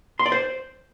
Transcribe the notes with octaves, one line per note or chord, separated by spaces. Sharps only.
C6
D5
C5